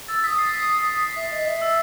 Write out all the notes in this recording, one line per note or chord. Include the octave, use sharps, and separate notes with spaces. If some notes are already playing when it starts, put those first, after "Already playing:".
E6 A6
D#6 E6 B6
C7
B6
B6
B6
C7
E5 B6
D#5
E5
E6